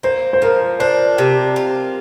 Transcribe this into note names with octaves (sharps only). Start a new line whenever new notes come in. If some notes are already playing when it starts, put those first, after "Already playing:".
A#3 C5
C5
F3 A#4
D4 C5
C3
F4